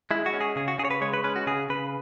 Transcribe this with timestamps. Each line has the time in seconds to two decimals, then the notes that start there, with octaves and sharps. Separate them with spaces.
0.11 G#3 E4
0.26 F#4
0.33 C#4
0.41 G#4
0.56 C#3 G#4
0.68 F#4
0.79 C#3 G#4
0.85 C#5
0.91 B4
1.01 G#3 C#5
1.14 B4
1.24 C#4 B4
1.36 F#4
1.47 C#3 G#4
1.70 C#3 B4